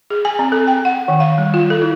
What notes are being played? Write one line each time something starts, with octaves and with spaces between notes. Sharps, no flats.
G#4
G#5
C4
A4
G5
F#5
D#3
F5
G3
F4
A4
E4